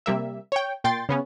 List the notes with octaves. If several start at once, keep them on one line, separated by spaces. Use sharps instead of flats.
C3 G3 A#3 E5
C#5 G5
A#2 G5 C6 A6
C#3 B3 C#4